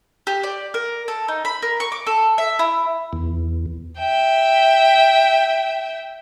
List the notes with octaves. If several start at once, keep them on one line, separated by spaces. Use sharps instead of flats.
G4
D5
A#4
A4
D#4
B5
A#4
C#6
D6
A4
E5
E4
E2
E5 G5